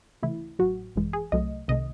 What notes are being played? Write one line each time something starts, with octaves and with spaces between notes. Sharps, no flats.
C#2 C3 E3 A3 E4
A1 A2 F#3 F#4
G#1 F#2 E3 G#3
G#4
C2 C3 F#3 A3 D#5
C2 C3 D#3 A3 D#5